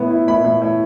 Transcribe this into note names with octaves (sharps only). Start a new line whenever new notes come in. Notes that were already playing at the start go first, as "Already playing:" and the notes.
Already playing: A2 B3
E4
A2 B5
A2
A2